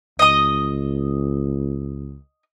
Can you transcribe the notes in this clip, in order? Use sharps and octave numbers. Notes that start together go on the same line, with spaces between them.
C#2 D#5 D#6